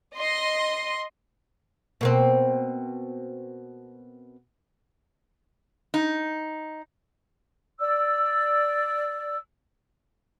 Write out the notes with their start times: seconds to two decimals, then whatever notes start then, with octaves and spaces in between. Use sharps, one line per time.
0.16 D#5 C6
2.01 B2 A#3 C4
5.94 D#4
7.79 D5 E6